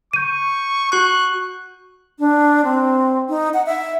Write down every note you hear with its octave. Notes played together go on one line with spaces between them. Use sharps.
C#6 G6 D#7
F#4 C#6 F#6
D4
C4
D#4
F#5
E5